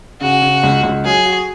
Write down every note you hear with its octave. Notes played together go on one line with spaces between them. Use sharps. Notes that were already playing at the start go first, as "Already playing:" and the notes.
C#3 F#4
C#3
C#2
C#2
F#3 G#4
F#4